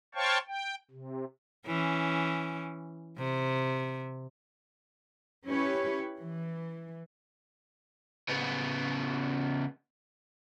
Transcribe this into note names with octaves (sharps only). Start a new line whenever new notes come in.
C5 C#5 F5 G5 A5 C#6
G5
C3
E3 C#4
C3
C#4 E4 G4 B4 C#5
E3
C#3 B3